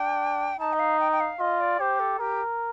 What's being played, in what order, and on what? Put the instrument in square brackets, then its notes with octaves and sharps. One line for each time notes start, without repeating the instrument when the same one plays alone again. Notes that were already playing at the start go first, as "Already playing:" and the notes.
Already playing: [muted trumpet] D4 [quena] G5
[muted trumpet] D#4 [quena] A5
[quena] D#5
F5
G5
G5
F5
[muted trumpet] F4 [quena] D#5
[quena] D5
[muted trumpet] G4 [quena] C5
[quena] A4
[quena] G4 [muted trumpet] A#4